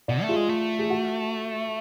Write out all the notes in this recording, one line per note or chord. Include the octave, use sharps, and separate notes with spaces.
B2 D5 F#5
A3
F4 G#4
G#3
A3
G#4
F#4